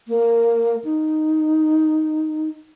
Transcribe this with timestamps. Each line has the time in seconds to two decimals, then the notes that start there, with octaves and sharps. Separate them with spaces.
0.08 A#3
0.84 D#4